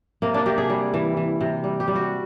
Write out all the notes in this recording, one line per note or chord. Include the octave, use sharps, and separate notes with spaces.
C3 A#3
D4
C3 G4
G#4
G3
E3
E3
C3
G3
G4
G3
F#4